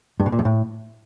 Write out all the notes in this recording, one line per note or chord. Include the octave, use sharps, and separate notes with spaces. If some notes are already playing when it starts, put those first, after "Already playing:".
G2
B2
A#2
F#2
A2